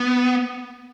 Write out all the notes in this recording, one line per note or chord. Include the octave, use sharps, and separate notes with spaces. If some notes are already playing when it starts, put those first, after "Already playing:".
Already playing: B3